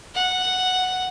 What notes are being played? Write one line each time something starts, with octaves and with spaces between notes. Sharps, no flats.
F#5